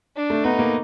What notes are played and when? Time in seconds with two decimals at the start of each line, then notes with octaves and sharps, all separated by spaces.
0.16 D4
0.30 A3
0.44 B3 D#4
0.59 A#3